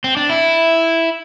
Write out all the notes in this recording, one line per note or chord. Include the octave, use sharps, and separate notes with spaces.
C4
D4
E4